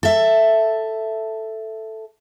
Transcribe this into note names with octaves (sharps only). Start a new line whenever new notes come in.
A4 E5